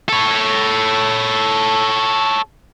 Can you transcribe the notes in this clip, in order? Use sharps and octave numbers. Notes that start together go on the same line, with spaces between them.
A4 C#5